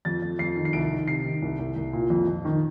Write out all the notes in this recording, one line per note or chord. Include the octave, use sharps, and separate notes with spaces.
F2 A6
F2
F2 C7
D#3
C7
C2 D7
D#3
C3 C7
D#3
C2
C2
C2
A#2
F2
F2
D#3